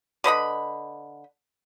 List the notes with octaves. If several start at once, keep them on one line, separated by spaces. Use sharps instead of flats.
D3 B4 D#5 B5